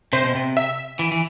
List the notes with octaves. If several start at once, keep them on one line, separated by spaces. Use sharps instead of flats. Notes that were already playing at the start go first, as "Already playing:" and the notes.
C3 C5
B2
C3
E5
E3
E3